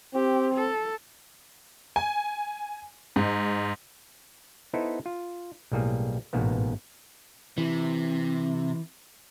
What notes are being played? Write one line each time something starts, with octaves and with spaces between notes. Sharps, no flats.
C4 G4
A4
G#5
G#2
B3 D#4 E4 A4 C5 D#5
F4
B1 A2 G3 A#3 G#4
A1 G#2 B2 A#3 B3
C3 E3